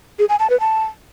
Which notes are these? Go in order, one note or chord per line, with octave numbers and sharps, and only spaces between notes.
G#4
G#5
A5
B4
A5